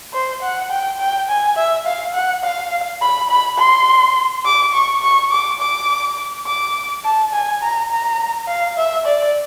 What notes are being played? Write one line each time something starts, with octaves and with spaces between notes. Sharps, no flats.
C5
F#5
G5
G5
G#5
E5
F5
F#5
F5
B5
B5
C6
D6
C#6
C#6
D6
D6
D6
A5
G#5
A#5
A#5
F5
E5
D5